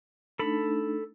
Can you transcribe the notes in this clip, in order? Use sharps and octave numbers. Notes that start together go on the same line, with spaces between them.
A3 D4 D#4 A4 B5